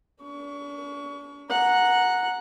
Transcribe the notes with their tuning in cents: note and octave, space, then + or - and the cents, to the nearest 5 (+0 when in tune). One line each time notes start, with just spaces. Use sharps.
D4 -40 C#6 +25
F#5 -10 A#5 +0